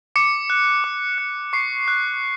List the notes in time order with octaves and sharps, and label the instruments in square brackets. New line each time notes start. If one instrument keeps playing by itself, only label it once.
[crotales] D6 C#7
F#6
D6
F#6
C#6 C7
F#6